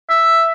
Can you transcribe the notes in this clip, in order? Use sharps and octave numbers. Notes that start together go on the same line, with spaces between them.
E5